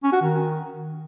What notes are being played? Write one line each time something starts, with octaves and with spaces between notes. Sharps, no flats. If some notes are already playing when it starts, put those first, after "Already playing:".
C#4
F#4
D#3